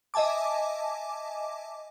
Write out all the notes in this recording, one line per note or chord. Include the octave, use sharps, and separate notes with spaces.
D#5 E5 G#5 A5 D6